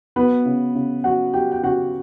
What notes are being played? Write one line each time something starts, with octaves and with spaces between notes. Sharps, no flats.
F#3 B3 B4
C#3
C#3
F#3 F#4 F#5
F#3 G4 G5
G5
C#3 F#4 F#5